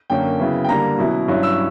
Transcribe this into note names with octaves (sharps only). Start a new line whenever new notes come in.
F#2 D3 A#3 C#4 G5
C#3 F#3 B3 E4
G5
D3 G3 A#3 A#5
B2 F#3 C#4 E4
G2 F#3 C#4 E4
E6